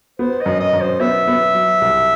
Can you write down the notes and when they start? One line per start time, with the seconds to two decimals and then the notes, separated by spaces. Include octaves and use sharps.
0.19 B3 C5
0.40 D#5
0.46 F#2
0.60 D#5
0.73 F#2
0.81 C5
1.00 B3 E5
1.27 B3
1.55 F#3
1.81 C2